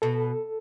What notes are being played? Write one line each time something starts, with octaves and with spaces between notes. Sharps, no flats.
B2 A4